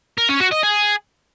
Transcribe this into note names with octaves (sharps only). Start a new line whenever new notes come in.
A#4
C#4
F#4
D#5
G#4